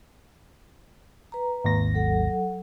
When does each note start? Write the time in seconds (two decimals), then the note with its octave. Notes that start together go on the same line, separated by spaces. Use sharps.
1.32 B4 A#5
1.65 G#1 D#2 A#6
1.94 F#3 A4 F#5